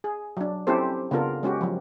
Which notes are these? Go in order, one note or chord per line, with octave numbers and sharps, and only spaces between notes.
G#4
F#3 D4
C4 C#4 E4 G4 A4 C5
C#3 B3 D4 F4 A4 A#4
G#3 C#4 F#4 G4
F3 F#3